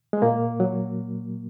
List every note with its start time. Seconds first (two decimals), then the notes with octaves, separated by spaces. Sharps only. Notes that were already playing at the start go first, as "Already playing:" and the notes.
0.13 G#3
0.22 A#2 A#3
0.60 F#3